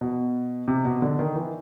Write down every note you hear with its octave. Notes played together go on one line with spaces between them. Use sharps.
B2
C3
B2
D3
D#3
E3